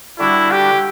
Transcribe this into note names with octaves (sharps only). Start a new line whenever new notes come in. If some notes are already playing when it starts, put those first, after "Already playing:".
D3 G3 D4 E4 F#4
G4